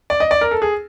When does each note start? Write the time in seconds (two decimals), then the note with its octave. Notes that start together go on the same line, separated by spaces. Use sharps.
0.10 D5
0.20 D#5
0.31 D5
0.41 A#4
0.51 A4
0.62 G#4